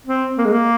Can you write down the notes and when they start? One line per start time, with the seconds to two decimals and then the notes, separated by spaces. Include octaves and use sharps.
0.06 C4
0.38 A#3
0.46 G#3
0.52 A#3